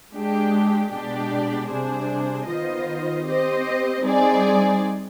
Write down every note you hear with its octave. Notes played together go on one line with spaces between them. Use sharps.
G#3 D4 G4
B2 G#3 D4 G4 D5
C3 G3 D4 G#4 C5
D#3 B3 F4 C5 D#5
C4 G4 C5 D#5
G3 C4 D#4 G#4 D5